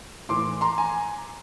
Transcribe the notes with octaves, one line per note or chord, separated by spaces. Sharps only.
A2 E3 C6 D6
A#5 C6
G#5 A#5